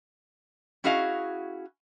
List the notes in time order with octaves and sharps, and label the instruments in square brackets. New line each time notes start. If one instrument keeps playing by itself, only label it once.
[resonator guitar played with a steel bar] C#4 E4 F#4 G#4 D#5 F5